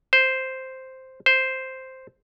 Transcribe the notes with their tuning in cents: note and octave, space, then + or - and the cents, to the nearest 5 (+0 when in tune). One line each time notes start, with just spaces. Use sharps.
C5 +0
C5 +0